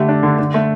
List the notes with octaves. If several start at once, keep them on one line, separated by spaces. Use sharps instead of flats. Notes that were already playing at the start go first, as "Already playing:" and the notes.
Already playing: D3 A3 G4
D4
D3
D3
A3